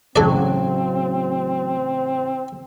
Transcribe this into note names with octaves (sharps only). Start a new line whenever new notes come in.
A1 C#3 F#3 C4 A4 D5